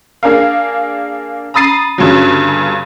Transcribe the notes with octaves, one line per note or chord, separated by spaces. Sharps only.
A#3 D4 G#4 A#4 F5
A#5 B5 D#6 A6 C7 D#7
G1 G2 C#3 F#3